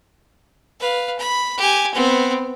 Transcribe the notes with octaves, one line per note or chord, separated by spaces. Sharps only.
B4 F5
B5
G4 G#5
B3 C4